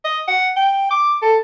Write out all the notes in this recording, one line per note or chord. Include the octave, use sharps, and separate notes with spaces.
D#5
F#5
G5
D6
A4